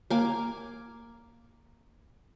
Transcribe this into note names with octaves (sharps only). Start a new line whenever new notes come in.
A#3 G#5 D6